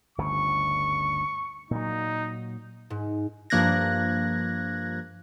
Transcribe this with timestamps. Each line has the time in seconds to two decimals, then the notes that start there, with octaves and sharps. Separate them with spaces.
0.18 G1 D2 C#3 C#6
1.71 A#2 F#3 D#4
2.90 G#2
3.50 G2 F3 A#3 F#6 G#6 A#6